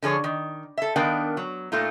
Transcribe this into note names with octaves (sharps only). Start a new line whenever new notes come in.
D3 F3 G#4 C#5
D#3
A4 E5
D#3 B3 D4 A#4 F5 G5
F#3
A#2 A3 D#4 F4